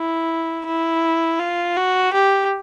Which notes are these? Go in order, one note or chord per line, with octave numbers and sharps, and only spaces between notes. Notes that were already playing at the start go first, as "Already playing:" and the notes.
Already playing: E4
E4
F4
F#4
G4